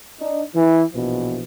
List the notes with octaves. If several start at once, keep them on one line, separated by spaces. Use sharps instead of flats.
D4 D#4
E3
A#1 B2 E3 F3